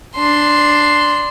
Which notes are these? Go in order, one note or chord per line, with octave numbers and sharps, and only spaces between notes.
D4 C6